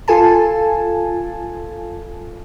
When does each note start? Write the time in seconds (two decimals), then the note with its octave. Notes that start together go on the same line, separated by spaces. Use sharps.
0.08 F4 A4 G#5 A5